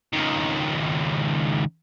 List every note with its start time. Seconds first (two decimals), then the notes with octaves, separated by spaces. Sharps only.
0.13 C#2 D#3